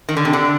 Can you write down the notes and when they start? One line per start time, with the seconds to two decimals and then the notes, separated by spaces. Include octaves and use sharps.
0.09 D#3
0.17 D3
0.25 C3
0.33 D3